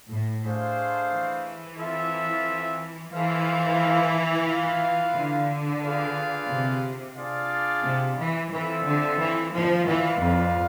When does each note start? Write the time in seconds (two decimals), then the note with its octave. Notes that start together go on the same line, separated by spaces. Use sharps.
0.09 A2
0.43 A3 D4 G#4 C5 F5
1.11 E3
1.78 C4 F4 A4 E5
3.12 E3 F4 A4 C5 F5
4.47 F4 B4 F5
5.15 D3
5.82 F4 G#4 B4 D5 F5
6.49 C3
7.17 D4 F4 G#4 D5 F5
7.84 C3
8.18 E3
8.51 E3 C4 F4 A4 E5
8.85 D3
9.18 E3
9.52 F3
9.85 E3 F4 B4 D5 F5
10.20 F2